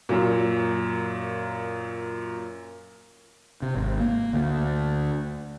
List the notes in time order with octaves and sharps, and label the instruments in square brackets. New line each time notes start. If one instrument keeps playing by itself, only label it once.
[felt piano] F#2 A#2
[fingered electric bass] C3
G#1
A#3
D2